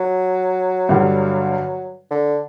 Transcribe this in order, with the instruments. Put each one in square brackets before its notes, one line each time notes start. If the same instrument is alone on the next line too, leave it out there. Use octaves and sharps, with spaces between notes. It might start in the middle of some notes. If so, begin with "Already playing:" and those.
Already playing: [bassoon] F#3
[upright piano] G2 D3 G3
[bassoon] D3